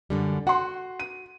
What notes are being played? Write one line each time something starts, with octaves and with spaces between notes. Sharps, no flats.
F#2 D3 G3
F#4 F#5 C6
D#7